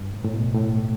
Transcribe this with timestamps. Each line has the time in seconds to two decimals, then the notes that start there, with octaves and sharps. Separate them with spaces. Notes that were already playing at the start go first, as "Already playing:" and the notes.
Already playing: G2
0.13 A2
0.25 A2
0.34 B2
0.55 A2